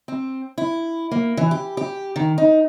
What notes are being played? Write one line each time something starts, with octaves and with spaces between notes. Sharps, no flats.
C4
E4
A#3
E3
G4
G4
D#3
D#4